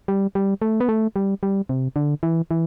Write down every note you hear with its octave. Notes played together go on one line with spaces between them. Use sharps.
G3
G3
A3
B3
A3
G3
G3
C3
D3
E3
E3